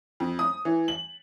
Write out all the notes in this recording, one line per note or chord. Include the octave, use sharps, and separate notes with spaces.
F2
D#6
E3
F#7